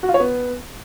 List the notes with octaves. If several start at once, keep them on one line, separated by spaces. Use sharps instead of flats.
F#4
F4
C#5
B3